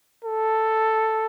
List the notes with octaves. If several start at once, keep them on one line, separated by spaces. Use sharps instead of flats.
A4